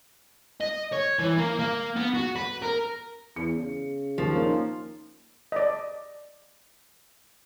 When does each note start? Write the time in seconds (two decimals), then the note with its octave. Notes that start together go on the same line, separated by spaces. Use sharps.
0.61 D#5
0.93 C#5
1.20 E3
1.38 A#3
1.59 A#3
1.96 B3
2.14 F#4
2.36 B4
2.62 A#4
3.36 E2 C#7
3.56 C#3
4.18 D#2 F3
4.35 A#3 C#4 D#4
5.52 D5 D#5